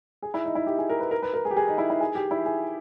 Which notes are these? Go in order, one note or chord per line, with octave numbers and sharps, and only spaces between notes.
G#4
E4
D#4
E4
G4
G#4
A#4
B4
A#4
B4
A#4
G#4
G4
G#4
D#4
E4
E4
G#4
G4
E4
G#4